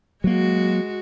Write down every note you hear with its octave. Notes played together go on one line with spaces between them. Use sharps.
F#3 G#3 A#3 F#4